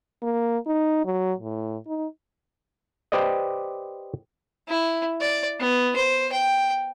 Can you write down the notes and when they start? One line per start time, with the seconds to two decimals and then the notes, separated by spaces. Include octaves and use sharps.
0.22 A#3
0.67 D#4
1.05 F#3
1.38 A2
1.87 D#4
3.12 G4 B4 C5 D5 D#5
4.68 E4
5.21 D5
5.60 B3
5.96 C5
6.32 G5